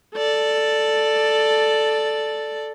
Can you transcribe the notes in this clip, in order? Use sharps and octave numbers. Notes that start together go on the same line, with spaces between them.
A4 D5